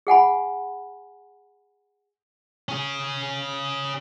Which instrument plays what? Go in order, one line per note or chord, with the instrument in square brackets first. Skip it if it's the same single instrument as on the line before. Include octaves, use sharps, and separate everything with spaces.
[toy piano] G#4 F#5 G#5 B5
[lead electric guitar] C#4 G#4